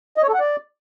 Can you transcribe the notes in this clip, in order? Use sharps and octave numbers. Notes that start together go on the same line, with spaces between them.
D#5
C#5
A4
F#5
D5